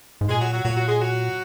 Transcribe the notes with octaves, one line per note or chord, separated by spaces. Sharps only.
G#2
A#2 G#3 G#4
F#3 F#4
F#3 F#4
A#2 F#3 F#4
F#3 F#4
G#3 G#4
F#3 F#4